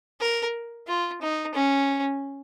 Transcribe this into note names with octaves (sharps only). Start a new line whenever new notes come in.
A#4
F4
D#4
C#4